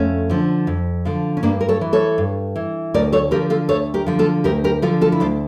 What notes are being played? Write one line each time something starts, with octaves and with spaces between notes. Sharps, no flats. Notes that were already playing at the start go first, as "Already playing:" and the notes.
Already playing: F2 A3 C#4
D3 F3
F2
D3 F3
C#4
G2 A#3 D4
A#4
A4 C#5
E3
A4 C#5
G2
E3
D2 A#4 D5
A4 C#5
D3 F3 G4 A#4
F4 A4
D2 A4 C#5
G4 A#4
D3 F3
F4 A4
D2 G4 A#4
G4 A#4
D3 F3 F4 A4
F4 A4
E4
D2 D4 F4